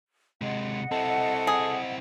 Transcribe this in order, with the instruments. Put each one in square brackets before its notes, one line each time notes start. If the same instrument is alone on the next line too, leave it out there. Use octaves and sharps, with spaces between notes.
[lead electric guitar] C3 G#3 [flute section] D#5 F#5
[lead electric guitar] C4 E4 [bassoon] A4
[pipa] G#4